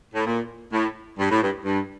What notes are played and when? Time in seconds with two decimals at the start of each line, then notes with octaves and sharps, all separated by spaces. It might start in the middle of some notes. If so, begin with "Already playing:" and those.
0.14 A2
0.26 A#2
0.72 A2
1.19 G2
1.31 A2
1.42 G2
1.65 G2